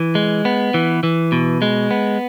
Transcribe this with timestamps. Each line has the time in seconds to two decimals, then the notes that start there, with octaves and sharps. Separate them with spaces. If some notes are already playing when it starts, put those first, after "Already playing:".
Already playing: E3
0.15 G#3
0.45 B3
0.74 E3
1.03 E3
1.32 B2
1.62 G#3
1.91 B3